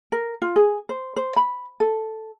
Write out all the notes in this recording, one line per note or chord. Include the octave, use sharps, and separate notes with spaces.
A#4
F4
G#4
C5
C5
B5
A4